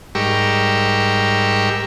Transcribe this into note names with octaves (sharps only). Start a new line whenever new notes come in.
G#2 G3 G4 A#4 C#6 E6